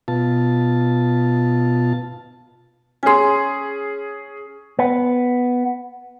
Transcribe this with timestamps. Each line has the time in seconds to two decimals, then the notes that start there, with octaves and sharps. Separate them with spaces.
0.08 B2 F4 A5
3.03 C#4 G#4 G#5 C6
4.79 B3